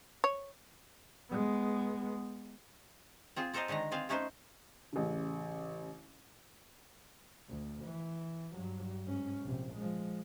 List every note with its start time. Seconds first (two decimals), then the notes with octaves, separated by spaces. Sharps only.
0.24 C#5
1.30 G#3 B3
3.36 C4 F4 G#4
3.53 C4 A4 A#4 C5 D#5 F5
3.68 D3 D#3 G#3 B4 A#5
3.92 C4 F4 G#4 F5
4.09 A3 C#4 D#4 B4 C5
4.93 A1 C#3
7.49 D2
7.85 E3
8.53 G2 F#3
9.05 G#2 C#4
9.42 A#1 C3
9.75 F3 G#3